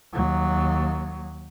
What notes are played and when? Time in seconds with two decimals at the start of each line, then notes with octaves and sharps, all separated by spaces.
0.13 D#2 F#3